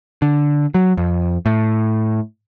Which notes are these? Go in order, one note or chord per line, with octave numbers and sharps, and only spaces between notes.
D3
F#3
F2
A2